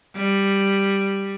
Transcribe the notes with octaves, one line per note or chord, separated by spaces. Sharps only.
G3